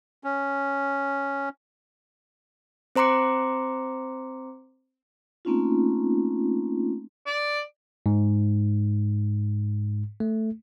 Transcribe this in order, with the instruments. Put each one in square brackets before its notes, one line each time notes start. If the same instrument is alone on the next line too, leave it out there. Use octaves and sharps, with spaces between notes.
[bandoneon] C#4
[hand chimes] C4 C5 A#5 C6 D6 C#7
[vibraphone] A3 A#3 C4 C#4 D#4 F4
[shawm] D5
[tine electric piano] G#2
A3